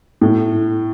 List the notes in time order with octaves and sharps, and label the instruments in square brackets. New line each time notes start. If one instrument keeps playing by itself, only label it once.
[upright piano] A2